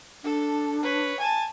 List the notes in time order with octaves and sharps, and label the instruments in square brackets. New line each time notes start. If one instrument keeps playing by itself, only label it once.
[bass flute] D4 [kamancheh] A4
[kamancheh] B4 C#5
G#5 A5